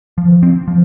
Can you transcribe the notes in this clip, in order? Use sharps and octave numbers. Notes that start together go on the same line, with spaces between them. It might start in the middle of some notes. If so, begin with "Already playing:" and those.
F3
C4
F3